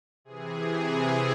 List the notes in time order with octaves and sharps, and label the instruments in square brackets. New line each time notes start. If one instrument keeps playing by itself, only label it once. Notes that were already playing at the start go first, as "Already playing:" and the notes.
[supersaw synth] C3 E3 G#4